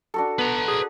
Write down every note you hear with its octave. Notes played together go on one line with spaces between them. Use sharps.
D4 F#4 A4
B3 B4 A#5
G#4